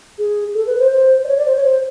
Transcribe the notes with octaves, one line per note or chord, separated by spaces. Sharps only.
G#4
A4
B4
C5
C5
D5
C#5
D5
C5
C#5
C5